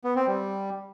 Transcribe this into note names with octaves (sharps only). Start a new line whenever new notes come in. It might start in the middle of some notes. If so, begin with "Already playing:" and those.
B3
C4
G3